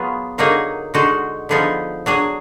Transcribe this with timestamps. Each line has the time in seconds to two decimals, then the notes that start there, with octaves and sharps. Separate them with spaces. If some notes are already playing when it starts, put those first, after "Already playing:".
Already playing: F#3 B3 F4 G#4
0.38 D3 F#3 A#3 D#4 G#4
0.94 D3 G#3 D#4 F#4
1.49 D3 F3 B3 D#4 G#4
2.06 F#3 D4 G#4